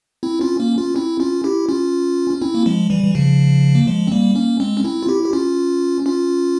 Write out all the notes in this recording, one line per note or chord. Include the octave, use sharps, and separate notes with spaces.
C4 E4
C#4 F4
A#3 C#4
C#4 F4
C4 E4
C#4 F4
E4 G4
C#4 F4
C#4
C4 E4
A#3
F3 G#3
E3 G3
E3
C#3 F3
A#3
F3 G#3
C4
G3 A#3
A#3 C#4
G#3 C4
C#4
C4 E4
F4
E4 G4
G4
C#4 F4
C#4 F4